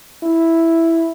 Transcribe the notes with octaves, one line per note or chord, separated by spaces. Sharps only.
E4